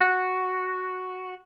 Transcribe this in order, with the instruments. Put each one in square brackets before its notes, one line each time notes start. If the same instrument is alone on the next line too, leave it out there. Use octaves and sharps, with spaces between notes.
[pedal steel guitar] F#4